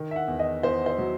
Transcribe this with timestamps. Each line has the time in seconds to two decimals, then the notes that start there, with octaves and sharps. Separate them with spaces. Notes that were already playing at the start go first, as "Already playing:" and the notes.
Already playing: D#3
0.11 E5
0.16 F#5
0.28 E2
0.39 D#5
0.63 E2 C5
0.86 C5
0.99 F#3